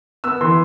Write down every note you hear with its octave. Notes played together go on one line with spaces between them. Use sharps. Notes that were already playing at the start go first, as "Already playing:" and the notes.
B3 E6
E3 C6